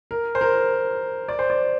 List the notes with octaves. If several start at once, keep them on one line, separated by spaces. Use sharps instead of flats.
A#4
C5
A#4
D5
C5
D5